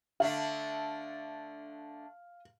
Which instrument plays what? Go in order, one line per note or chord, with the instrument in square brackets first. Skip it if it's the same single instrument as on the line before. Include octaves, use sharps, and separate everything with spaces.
[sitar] D3 A3 D4 [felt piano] F5